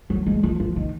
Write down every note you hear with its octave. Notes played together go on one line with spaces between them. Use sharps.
F#3
G#3
F3
F3
D#3